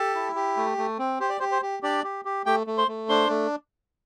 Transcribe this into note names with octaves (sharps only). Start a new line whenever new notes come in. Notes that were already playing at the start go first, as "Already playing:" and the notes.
Already playing: G4 A4 A5
E4
G4
A3
A3
C4
G4 C5
D5
G4 C5
C5
G4
D4 G4 D5
G4
G4
A3 G4 G5
A3
C5 C6
A3
D4 C5 C6
A3